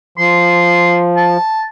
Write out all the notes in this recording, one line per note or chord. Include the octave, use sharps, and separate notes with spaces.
F3 C6
A5